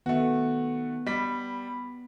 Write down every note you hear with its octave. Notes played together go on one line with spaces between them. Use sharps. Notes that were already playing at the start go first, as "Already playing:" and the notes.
D#3 A3 B3 F#4
G3 B5 B6